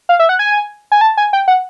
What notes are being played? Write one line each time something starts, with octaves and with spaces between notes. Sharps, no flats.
F5
E5
F#5
G#5
G#5
A5
G#5
G5
F#5